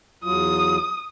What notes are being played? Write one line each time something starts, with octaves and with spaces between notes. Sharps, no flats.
E2 F#3 F4 D#6